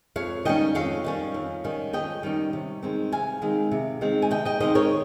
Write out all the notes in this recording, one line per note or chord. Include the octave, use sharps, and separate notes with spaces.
F2 C#5 F5
D#3 G3 C#4 D#5 G5
F2 C#5 F5
D#3 G3 C#4
F2
D#3 G3 C#4
F2 D#5 G5
D#3 G3 C#4
C3
D#3 G#3 C4
C3 F5 G#5
D#3 G#3 C4
C3
D#3 G#3 C4
G#5
C3 D#5 G5
D#5 G5
D#3 G#3 C4 C5 D#5
A#4 C#5